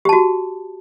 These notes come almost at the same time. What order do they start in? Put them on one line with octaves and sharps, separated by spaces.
G4 A5 F#4